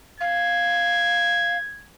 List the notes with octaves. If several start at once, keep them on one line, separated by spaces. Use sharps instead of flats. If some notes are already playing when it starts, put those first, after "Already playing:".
F5 G#6